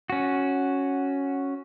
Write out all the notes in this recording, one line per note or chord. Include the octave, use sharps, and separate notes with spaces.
C#4 F#4